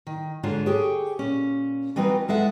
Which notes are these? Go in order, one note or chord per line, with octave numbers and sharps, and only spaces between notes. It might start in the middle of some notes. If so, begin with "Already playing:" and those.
D#3
G#2 D3 F4 C#5
G4 G#4 C#5
A#2 C#4
E3 G3 C4 D#4 F#4 B4
E2 G#3 A4 E5 F#5